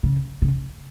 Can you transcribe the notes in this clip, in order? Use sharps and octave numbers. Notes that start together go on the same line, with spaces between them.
C#3
C#3